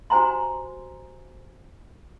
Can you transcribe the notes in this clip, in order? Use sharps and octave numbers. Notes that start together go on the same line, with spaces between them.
F#4 G4 C5 G#5 A#5 C6